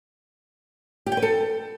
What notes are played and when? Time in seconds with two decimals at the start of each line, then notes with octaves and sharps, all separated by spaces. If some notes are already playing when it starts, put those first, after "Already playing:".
1.06 G4
1.12 G5
1.17 B4
1.22 A4